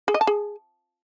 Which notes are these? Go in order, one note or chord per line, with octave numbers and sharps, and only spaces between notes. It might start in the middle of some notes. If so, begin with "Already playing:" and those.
G#4
D#5
A5
G#4